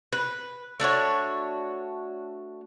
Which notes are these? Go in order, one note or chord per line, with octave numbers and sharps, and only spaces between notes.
B4
A3 D4 F#4 C#5